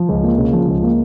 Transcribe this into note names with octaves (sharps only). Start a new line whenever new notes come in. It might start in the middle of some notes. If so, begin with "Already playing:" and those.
Already playing: F3
C#2
A#3
C#3
F3
C#2
A#3